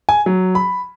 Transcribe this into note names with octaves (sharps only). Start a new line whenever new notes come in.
G#5
F#3
B5